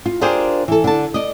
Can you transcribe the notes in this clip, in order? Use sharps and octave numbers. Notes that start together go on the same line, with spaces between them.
F4
D4 F4 G4 G#4 A#4 C5
E3 A4
D3 A5
D5 D#5